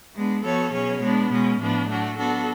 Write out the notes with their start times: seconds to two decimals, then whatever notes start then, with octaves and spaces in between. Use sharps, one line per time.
0.15 G#3 B3 D4
0.44 F3 B3 F#4 A4 C#5
0.73 B2 F#3 C#4 G#4 C#5
1.02 G#3 B3 D4
1.30 B2 G#3 C#4
1.60 A2 F3 B3 D4
1.89 F#3 A3 D4 F#4
2.18 F#3 B3 D4 F#4 A4